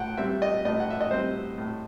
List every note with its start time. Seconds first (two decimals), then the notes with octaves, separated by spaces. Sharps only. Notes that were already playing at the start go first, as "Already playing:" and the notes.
Already playing: A2 F#5 G5
0.17 G3 C4 E5
0.42 D#5
0.65 A2 D#5
0.80 F#5
0.90 E5
1.01 D#5
1.11 G3 C4 C5
1.58 A2